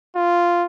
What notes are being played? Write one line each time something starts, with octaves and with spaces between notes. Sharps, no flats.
F4